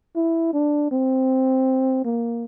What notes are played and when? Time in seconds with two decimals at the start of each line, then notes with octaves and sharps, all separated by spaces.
0.16 E4
0.53 D4
0.92 C4
2.05 A#3